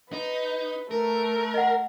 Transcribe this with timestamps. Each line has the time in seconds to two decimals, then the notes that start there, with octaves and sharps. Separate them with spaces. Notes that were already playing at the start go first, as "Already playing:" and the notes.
0.13 D#4 B4
0.91 A3 A#4
1.54 D#5 F#5